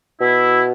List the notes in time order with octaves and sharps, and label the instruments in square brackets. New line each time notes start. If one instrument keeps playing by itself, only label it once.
[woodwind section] B2 E4